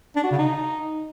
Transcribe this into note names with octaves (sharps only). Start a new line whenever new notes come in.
D4
F#4
C#3
D#4